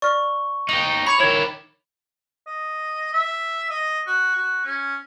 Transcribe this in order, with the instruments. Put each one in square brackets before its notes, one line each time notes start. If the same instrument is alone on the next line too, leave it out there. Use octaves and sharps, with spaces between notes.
[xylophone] D5 F6 [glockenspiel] C#6
[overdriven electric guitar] D#4 G4 [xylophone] F#7
[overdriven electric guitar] C#5 [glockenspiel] B5 D6 F7
[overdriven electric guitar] D#3 E4 [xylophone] C#5 G#6
[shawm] D#5
E5
D#5
F#4
F#4
C#4